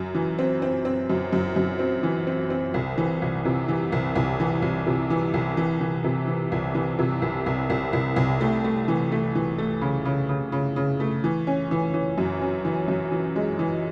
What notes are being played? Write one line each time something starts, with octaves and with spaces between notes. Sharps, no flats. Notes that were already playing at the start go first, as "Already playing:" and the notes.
Already playing: F#2
E3
C4
C4
C4
F#2
F#2
F#2
C4
E3
C4
C4
C2
E3
C2
C3
E3
C2
C2
E3
C2
C3
E3
C2
E3
E3
C3
E3
C2
E3
C3
C2
C2
C2
C2
C2
A3
A3
E3
A3
E3
A3
C#3
C#3
C#3
C#3
C#3
A3
E3
C#4
E3
E3
F#2
C#4
E3
F#2
E3
G#3
E3